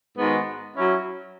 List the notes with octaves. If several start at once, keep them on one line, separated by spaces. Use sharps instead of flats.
G#2 D#3 G#3 B3 F#4
F#3 C#4 E4